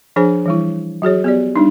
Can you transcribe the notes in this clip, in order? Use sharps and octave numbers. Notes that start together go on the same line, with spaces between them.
F3 D4 G#4 C5 G#5
E3 G3 E4
F#3 F#4 G#4 C#5
B3 G4 D5
G3 D4 D#4